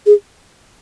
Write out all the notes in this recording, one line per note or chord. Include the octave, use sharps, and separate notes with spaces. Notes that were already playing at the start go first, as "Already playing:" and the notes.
G#4